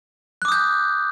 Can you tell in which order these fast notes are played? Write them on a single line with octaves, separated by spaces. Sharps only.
F#6 D6 D#6 G6